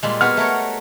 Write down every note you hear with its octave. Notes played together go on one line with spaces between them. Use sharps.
A#2 G3 G#3
B3 F#4 G#4 F6
A3 A#4 C#5